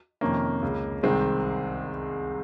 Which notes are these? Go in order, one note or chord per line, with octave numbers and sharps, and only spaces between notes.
F2 C3 D#3 A#3 C#4
C#2 C#3
C2 C3 D#3 G#3 C4